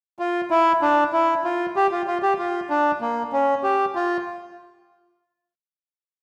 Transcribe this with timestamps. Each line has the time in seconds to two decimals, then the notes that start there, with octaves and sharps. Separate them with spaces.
0.19 F4
0.51 E4
0.82 D4
1.12 E4
1.44 F4
1.76 G4
1.91 F4
2.07 F4
2.22 G4
2.38 F4
2.70 D4
3.01 A#3
3.33 C#4
3.63 G4
3.95 F4